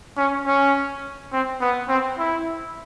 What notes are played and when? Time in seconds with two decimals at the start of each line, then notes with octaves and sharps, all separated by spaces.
0.17 C#4
0.46 C#4
1.33 C4
1.61 B3
1.89 C4
2.18 E4